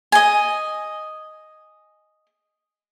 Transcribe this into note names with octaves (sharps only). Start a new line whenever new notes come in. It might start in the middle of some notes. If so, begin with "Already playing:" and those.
D#5 G#5